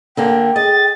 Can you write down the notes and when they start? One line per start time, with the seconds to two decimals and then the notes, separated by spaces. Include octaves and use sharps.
0.17 D3 A#3 G4 G5
0.56 G#4 D#5 A6